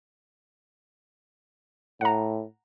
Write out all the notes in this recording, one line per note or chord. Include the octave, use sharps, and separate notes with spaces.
A2 F#5 A#5